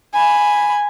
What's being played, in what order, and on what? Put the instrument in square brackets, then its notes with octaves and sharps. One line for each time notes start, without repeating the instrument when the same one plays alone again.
[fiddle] G#5 B5